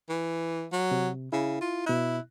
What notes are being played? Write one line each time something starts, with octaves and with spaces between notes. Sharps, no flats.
E3
F#3
C3
C#3 E4
F4
B2 E4 F#6